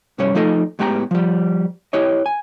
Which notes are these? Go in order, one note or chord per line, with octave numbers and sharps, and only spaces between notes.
C2 G2 G3 C#4 C#5
F3 A3 D#4 A4 D#5
A2 G#3 B3 G4 G#5 A#5
F3 G3
E4 G4 C#5 D#5
G#5